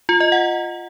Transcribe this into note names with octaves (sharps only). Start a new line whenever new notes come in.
F4
D#5
F#5